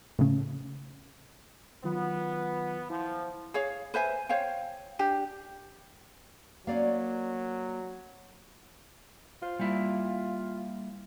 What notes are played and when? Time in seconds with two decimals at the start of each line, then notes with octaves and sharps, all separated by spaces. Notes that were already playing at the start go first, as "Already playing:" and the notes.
0.19 A2 C#3
1.84 D#3 F#3 B3 F4
2.90 F3 E4
3.54 G#4 C#5 F5
3.94 B4 C5 E5 G#5
4.29 C5 C#5 F5 G5
4.99 D4 G4
6.67 F#3 A#3 C#4 D5 F5
9.43 F4 C5
9.59 G3 A#3 E4